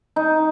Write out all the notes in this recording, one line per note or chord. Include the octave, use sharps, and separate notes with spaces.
D#4